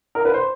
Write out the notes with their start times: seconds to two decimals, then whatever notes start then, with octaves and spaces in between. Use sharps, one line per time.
0.15 A#4
0.25 B4
0.34 C5